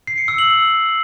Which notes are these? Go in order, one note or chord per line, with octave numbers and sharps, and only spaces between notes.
C7
C#7
E6
F#7